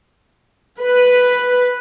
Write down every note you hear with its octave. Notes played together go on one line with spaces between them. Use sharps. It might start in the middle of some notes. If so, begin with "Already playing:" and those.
B4